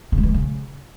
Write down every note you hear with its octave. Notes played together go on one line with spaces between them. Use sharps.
C#3
G#3
E3
G#3
C#3